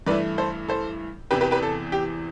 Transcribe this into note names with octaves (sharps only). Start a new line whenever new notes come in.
G2 E3 A3 E4 B4 D5
A4 C5
A4 C5
E2 C3 E3 G4 B4
G4 B4
G4 B4
A4
G4